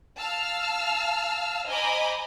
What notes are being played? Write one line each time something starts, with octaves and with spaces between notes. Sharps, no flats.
F5 A5 E6 F6
C5 D#5 G#5 A#5 B5 D6